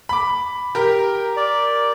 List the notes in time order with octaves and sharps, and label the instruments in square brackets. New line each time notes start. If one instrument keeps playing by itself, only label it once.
[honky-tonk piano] B5 D6
G4 A#4
[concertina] D5